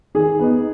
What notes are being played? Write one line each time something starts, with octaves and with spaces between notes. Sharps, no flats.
D#3 G#4
B3 D#4